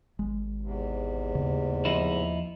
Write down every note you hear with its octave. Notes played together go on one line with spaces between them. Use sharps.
G#1 G#3
E2 G#2 C3
D#2 C#3
F3 D#4 E4